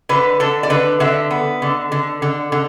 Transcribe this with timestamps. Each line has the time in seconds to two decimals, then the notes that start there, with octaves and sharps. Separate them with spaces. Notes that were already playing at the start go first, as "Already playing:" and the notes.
0.09 D3 B4
0.40 D3 A4
0.63 D5
0.70 D3 B4
1.00 D3 E5
1.31 B3
1.62 D3
1.92 D3
2.22 D3
2.52 D3